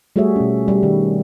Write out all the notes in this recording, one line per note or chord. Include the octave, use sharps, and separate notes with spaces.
G3 A3 F#4 G#4 C#5 E5
B2 C#4
G3
D#3